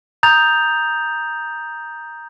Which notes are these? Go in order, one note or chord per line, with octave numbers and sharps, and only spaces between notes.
A#5 D#6 G6 A6 F7